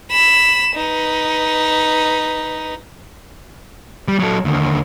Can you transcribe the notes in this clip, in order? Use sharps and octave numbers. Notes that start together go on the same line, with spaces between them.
B5 E7
D#4 B4
G3
F#3 A4
D#2 D3